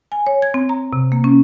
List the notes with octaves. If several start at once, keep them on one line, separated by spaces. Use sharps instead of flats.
G#5
C#5
G#6
C4
A#5
C3
A#3
C#4